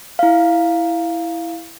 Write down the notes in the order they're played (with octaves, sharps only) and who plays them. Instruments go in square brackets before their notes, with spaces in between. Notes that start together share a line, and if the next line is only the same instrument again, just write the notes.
[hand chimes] E4 F5